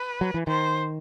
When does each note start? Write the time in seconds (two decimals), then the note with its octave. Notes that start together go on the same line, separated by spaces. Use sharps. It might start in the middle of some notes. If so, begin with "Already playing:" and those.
Already playing: B4
0.21 F#3
0.34 E3
0.47 D#3 C5